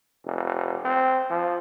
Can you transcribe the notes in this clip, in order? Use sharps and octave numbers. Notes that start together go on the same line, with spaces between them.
F1
C4
F3